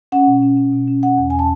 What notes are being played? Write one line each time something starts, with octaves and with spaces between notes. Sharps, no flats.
C#4 F#5
B2
C#4
C#4
B2
C#4
C#4 F#5
E2
C#4 G#5
A5